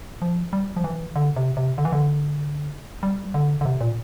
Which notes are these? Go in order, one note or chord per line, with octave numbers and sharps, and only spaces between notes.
F3
G3
F3
E3
D3
C3
C3
D3
E3
D3
G3
D3
D3
C3
A#2